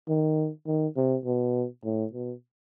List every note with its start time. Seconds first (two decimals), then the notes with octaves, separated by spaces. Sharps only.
0.08 D#3
0.67 D#3
0.96 C3
1.25 B2
1.84 A2
2.13 B2